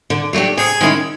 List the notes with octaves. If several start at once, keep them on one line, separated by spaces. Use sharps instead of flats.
D3
F#3 A3 D4 G4
C3 G#4
D#3 G#3 C#4 E4